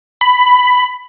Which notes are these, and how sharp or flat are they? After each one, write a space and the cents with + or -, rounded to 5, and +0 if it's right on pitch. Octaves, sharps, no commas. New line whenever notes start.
B5 +10